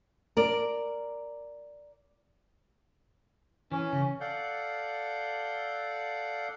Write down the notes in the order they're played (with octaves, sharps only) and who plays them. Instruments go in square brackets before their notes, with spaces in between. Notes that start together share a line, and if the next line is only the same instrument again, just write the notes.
[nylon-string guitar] A#4 D5
[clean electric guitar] E3 [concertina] C#4
[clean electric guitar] C#3
[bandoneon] A4 D5 F5 F#5 G6